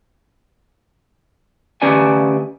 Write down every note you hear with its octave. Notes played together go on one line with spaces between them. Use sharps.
D2 C#4 G4 B4 D5 G#5